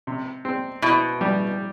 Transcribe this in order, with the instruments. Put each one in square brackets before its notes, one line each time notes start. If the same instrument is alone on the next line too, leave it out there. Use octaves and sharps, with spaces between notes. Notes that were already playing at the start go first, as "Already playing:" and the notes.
[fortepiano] C3
C4
[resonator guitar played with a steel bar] B2 [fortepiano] E4
[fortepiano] G3